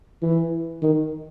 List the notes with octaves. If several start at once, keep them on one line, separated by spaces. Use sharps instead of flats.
E3
D#3